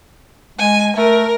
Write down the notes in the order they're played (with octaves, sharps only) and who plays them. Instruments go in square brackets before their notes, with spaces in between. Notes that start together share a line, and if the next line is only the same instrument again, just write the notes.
[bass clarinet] G#3 [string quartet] G#5
[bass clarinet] A3 [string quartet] A#4